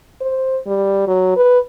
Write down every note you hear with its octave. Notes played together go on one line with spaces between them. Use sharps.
C5
G3
F#3
B4